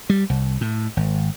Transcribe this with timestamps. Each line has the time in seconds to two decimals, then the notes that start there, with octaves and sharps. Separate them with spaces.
0.10 G3
0.30 C2
0.61 A2
0.97 G#1